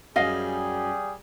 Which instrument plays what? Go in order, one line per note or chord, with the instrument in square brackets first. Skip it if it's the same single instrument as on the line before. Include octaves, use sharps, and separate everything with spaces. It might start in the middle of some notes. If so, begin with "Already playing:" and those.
[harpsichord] F#2 [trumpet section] G3 G#4 [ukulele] D#5 F5